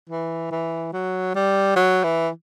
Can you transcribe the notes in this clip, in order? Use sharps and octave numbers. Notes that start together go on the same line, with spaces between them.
E3
E3
F#3
G3
F#3
E3